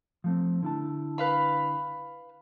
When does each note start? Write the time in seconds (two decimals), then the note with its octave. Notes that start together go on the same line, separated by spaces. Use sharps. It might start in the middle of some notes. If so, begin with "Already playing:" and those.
0.24 F3 A3 C4
0.63 D3 E4 A5
1.18 B4 F5 B5